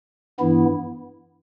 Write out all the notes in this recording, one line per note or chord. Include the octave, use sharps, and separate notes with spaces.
G2 E3 B3 E4